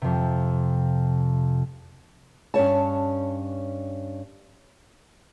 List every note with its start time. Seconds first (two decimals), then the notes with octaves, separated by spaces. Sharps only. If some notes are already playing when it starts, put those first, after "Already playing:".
0.02 F2 C3
2.54 G2 C#4 C#5 A5